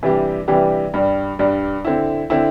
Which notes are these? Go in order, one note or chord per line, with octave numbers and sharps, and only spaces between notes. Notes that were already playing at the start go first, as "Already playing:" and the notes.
C3 E3 G3 D4 G4
C3 E3 G3 D4 G4
G2 G3 D4
G2 G3 D4
D3 C4 E4
D3 C4 E4